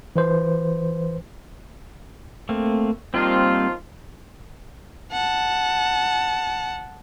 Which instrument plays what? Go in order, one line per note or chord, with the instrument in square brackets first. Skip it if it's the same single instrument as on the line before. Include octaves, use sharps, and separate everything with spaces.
[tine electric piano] E3 B4 C5
[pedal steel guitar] A3 A#3 C4
[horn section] D#3 F3 F4 [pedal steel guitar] G3 A#3 C4
[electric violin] F#5 A5